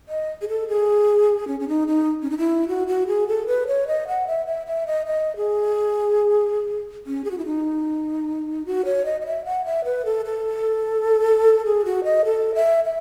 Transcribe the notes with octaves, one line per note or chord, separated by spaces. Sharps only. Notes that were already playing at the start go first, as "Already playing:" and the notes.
D#5
G#4
A4
G#4
C#4
C#4
D#4
D#4
C#4
D#4
E4
F#4
F#4
G#4
A4
B4
C#5
D#5
F#5
E5
E5
E5
D#5
D#5
G#4
C#4
G#4
F#4
E4
D#4
F#4
C#5
D#5
D#5
E5
F#5
E5
B4
A4
A4
G#4
F#4
D#5
A4
E5
E5